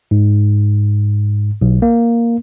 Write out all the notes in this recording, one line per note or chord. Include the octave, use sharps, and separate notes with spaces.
G#2
B1
A#3